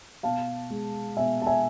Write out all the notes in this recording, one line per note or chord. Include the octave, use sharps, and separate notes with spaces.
B2 F5 A5
G#3
B2 E5 G#5
A5
E5 G#5